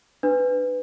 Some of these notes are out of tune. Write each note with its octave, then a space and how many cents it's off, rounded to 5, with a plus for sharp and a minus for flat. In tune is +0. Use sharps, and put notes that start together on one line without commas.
D4 +25 B4 +15